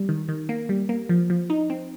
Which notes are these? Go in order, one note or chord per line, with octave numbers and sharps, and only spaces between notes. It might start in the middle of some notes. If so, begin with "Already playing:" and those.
Already playing: G3
D#3
D#3
A#3
G3
A#3
F3
F3
D#4
C4